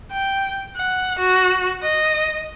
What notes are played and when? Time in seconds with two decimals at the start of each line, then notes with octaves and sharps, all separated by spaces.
0.12 G5
0.77 F#5
1.19 F#4
1.82 D#5